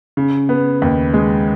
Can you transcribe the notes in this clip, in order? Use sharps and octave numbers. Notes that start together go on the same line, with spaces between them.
C#3
B3
D#2
G#3